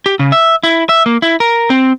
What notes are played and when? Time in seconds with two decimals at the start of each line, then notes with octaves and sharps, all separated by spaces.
0.06 G4
0.19 C#3
0.32 E5
0.63 E4
0.89 E5
1.06 A#3
1.22 E4
1.40 A#4
1.70 C4